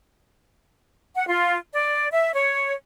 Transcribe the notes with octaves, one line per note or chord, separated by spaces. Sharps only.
F#5
F4
D5
E5
C#5